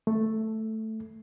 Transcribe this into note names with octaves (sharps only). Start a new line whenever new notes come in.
A3